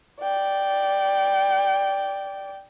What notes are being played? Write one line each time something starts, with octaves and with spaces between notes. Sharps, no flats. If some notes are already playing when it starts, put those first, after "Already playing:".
D5 G5